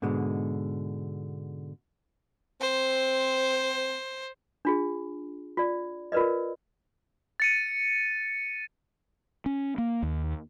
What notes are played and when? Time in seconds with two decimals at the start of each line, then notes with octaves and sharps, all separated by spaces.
0.02 G#2 B2 D3 G#3
2.61 C4 C5
4.65 D4 F4 G#4
5.57 F4 D5
6.12 F4 A#4 B4 D5 D#5
7.40 A6 C#7 D#7
9.46 C#4
9.78 A#3
10.03 D#2